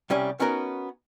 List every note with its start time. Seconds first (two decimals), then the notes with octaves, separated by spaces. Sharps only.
0.10 C2 G3 C#4 G#5
0.40 B3 C#4 D#4 F#4 A#4